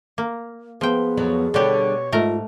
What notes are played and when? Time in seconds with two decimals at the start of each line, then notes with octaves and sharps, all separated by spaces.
0.18 A#3
0.81 F3 B3 G#4 G5
1.17 F2 F#3 C#5
1.54 B2 D3 G3 G4 C#5
2.12 G#2 A3 F4 A#4 A#5